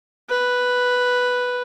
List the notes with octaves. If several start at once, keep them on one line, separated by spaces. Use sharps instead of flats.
B4